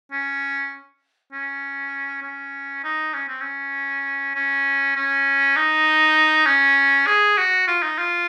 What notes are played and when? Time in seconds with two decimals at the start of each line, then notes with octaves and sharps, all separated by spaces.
0.12 C#4
1.32 C#4
2.23 C#4
2.84 D#4
3.14 C#4
3.28 C4
3.41 C#4
4.35 C#4
4.96 C#4
5.56 D#4
6.46 C#4
7.07 G#4
7.38 F#4
7.67 F4
7.83 D#4
7.98 F4